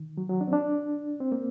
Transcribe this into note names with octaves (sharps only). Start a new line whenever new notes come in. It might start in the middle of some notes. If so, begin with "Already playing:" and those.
Already playing: D#3
F#3
F#3
D4
C4
D4
C4
A#3